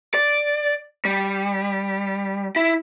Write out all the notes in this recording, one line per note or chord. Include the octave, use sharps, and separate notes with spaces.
D5
G3
E4